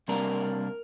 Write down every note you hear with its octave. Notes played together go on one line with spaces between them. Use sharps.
C3 G3 A#3 D4 A#4